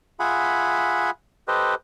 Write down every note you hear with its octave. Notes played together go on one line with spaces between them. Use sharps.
F4 G#4 E5 F#5 G#5 B5
G4 A4 B4 C5 D#5